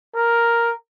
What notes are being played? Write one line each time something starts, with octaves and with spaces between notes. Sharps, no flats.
A#4